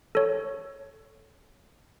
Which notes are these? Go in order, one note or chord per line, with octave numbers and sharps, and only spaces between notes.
A4 C#5